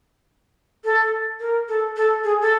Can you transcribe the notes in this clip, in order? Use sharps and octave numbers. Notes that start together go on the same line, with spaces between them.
A4
A#4
A4
A4
G#4
A4